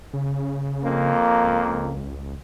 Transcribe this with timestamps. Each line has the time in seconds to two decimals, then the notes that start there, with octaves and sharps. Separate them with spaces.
0.13 C#3
0.84 F2 A#3
1.44 C#2